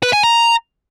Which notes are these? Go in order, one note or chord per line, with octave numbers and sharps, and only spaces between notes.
B4
G#5
A#5